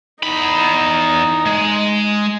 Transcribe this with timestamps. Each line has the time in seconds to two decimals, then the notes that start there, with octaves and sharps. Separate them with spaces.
0.23 E2 D#4 B5
1.46 G#3